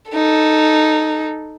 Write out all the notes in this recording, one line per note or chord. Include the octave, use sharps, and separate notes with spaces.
D#4 A4